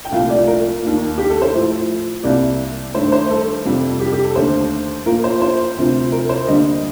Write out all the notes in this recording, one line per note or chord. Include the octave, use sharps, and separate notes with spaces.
G5
C2 A#2 F3 A3 F5
D5
A#4
D#2 D#3 A#3
G4
A4
C5
A2 F3 A3
C2 C3 G3 A#3 D5
G2 D#3 A3 C5
C5
A4
F2 C3 G3
G4
G4
A4
D#2 D3 A3 C5
A#2 F3 A#3 A#4
C5
C5
D2 C3 F3
A#4
C5
D2 D3 G3 A#3 D#5